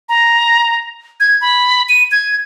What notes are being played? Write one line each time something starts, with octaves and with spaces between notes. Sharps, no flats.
A#5
G#6
B5
D#7
G#6